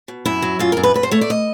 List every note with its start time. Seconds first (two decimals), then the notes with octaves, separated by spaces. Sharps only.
0.08 B2
0.25 F#2 E4
0.42 F#3
0.59 F#2 F4
0.72 F#2 A#4
0.83 B4
0.94 F#2 B4
1.03 C5
1.11 A3 C#5
1.21 D5
1.30 D#5